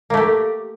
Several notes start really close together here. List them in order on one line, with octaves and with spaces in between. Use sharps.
A#3 A3 G4